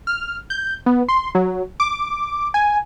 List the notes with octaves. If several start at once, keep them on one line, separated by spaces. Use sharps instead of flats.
F6
G6
B3
C6
F#3
D6
G#5